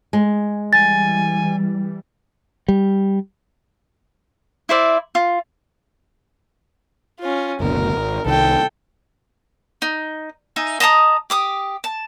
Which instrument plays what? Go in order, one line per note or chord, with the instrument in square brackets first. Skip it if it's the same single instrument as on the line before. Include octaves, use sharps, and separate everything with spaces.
[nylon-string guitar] G#3
[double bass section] E3 G3 [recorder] G#5 [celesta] A6
[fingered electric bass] G3
[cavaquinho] E4 C5 D5 E5
F4
[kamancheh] C#4 F4
[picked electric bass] F#1 D2 B2 [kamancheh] A#4
[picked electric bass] G#1
[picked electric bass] C2 D#3 [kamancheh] A4 G5
[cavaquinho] D#4
D#4 E5 G#5
D#5 A5 A#5 D#6
G4 D6 D#6
A5